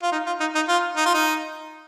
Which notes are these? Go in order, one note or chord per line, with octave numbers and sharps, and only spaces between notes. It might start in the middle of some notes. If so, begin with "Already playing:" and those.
F4
D#4
F4
D#4
D#4
F4
D#4
F4
D#4